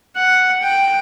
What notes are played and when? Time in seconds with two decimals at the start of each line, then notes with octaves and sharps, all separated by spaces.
0.16 F#5
0.62 G5